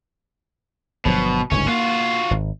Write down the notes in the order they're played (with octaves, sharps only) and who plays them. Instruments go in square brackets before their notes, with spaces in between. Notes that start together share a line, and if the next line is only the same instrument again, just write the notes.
[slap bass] G1 F3 F#3 [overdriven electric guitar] B2
[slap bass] G1 C#2 G#2 [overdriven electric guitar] C#4
[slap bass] A#3 [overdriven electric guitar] F4 F#4
[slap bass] G#1